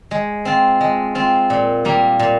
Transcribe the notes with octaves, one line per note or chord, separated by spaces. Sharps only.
G#3
C4 F4
G#3
C4 F4
A#2
G3 A#3
A#2